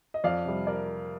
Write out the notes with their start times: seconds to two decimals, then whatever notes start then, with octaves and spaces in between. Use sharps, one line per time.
0.14 D#5
0.24 F2 D5 F5
0.45 C3 G3
0.67 A#4 D5